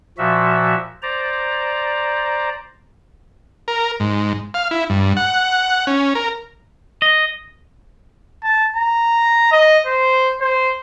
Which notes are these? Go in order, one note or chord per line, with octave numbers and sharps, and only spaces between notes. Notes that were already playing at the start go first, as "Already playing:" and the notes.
A#2 F3 F#4 E5
C5 D5 A#5
A#4
G#2
F5
E4
G2
F#5
C#4
A#4
D#5
A5
A#5
D#5
C5
C5